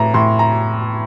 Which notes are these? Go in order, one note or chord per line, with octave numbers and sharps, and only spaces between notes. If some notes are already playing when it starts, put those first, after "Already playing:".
Already playing: A2 E3 A#5
A2 C6
A#5